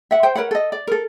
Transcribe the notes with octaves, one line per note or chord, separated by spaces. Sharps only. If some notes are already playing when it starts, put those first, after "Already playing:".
E5 F#5
C5 G5
A#4 B4 C#5 F#5
A4 D#5
D5
A4 A#4